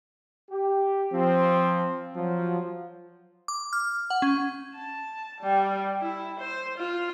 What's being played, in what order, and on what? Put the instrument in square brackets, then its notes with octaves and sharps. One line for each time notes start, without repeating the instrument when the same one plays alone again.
[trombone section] G4
F3 C4
F3 F#3
[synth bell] D6
F6
F#5
C#4
[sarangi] A5
G3
E4
C5
F4